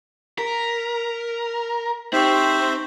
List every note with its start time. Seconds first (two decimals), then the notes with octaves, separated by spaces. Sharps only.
0.38 A#4 B6
2.13 C4 D#4 G4 C5 E5 C#6